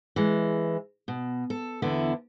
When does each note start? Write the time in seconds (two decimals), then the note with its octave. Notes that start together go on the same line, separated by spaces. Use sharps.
0.16 E3 G#3
1.08 B2
1.50 A4
1.82 E2 D3 B3 E4